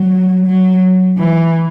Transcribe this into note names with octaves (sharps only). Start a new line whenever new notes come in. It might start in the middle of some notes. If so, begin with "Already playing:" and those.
Already playing: F#3
F#3
E3